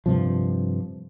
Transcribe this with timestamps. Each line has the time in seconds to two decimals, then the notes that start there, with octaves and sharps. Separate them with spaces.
0.06 G2 C3 F3